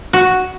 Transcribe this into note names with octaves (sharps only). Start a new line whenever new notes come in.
F#4